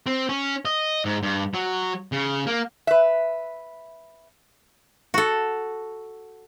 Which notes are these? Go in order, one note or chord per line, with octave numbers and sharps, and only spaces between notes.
C4
C#4
D#5
G#2
G2
F#3
C#3
A#3
B4 E5
F#4 A4